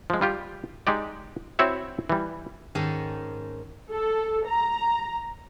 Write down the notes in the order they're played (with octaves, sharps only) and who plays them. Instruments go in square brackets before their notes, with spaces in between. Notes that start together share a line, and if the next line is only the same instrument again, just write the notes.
[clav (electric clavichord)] F3 G#3
G3 F4 G4
G#3 D#4 G4 D5
C4 E4 F#4 C#5 E5 F#5
E3 G3
[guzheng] G#2 D#3 C#4 G#4 A4
[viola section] A4
A#5